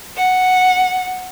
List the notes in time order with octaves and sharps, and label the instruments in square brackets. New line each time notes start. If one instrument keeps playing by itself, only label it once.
[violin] F#5